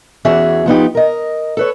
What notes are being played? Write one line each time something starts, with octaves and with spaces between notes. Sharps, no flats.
E2 E3 C#4 F#4 G#4 E5
F3 B3 D#4 G4
A#4 D#5
A4 B4 C#5